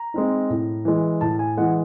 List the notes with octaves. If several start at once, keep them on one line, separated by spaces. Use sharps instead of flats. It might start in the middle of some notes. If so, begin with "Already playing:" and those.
Already playing: A#5
G#3 C4 D#4
A2
E3 G#3
A2 A5
G#5
E3 G#3 F#5